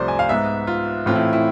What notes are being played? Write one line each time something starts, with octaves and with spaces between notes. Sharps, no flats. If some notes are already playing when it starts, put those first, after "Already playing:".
Already playing: C2 C3 F3 A3 C5 D5
G#5
F5
G#2 G#3 B3 E5
F4
A2 E3 A3 C4 F4
E4
E4